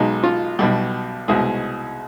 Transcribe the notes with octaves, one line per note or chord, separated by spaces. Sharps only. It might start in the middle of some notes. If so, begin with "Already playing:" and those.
Already playing: B1 B2 G#3 D#4
F4
B1 B2 G3
C2 B2 G#3 G#4